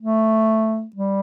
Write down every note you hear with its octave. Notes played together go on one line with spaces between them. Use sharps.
A3
G3